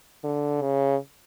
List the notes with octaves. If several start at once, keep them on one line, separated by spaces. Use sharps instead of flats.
D3
C#3